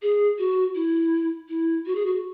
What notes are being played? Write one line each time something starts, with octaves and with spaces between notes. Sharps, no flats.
G#4
F#4
E4
E4
F#4
G#4
F#4